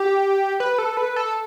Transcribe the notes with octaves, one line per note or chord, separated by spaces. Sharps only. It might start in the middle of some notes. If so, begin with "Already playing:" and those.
Already playing: G4
B4
A4
B4
A4